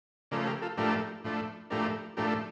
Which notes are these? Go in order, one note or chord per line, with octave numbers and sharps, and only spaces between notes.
C#3 F3 A3 A#4 D5
G4 A#4
F4 A4
A2 F3 A3 D4 G4 A#4
A2 F3 A3 D4
A2 F3 A3 D4 G4 A#4
A2 F3 A3 D4 G4 A#4